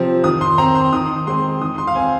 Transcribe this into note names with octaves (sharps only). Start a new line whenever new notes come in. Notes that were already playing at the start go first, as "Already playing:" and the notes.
Already playing: C3 F3 C4
D#3 D#6
C6
C4 A#5
C6
D#3 D#6
G#3 C4 C6
D#3 D#6
C6
F5
C4 G#5